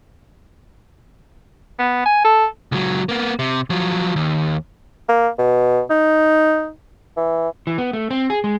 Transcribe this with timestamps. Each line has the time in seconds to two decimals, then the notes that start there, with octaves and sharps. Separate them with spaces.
1.79 B3
2.06 G#5
2.25 A4
2.72 C#2 F#3
3.09 A#3 B3
3.39 C3
3.70 F3 F#3
4.16 D#2
5.09 A#3
5.39 B2
5.90 D#4
7.17 E3
7.67 E3
7.78 B3
7.93 A3
8.11 C4
8.30 G#4
8.44 G#3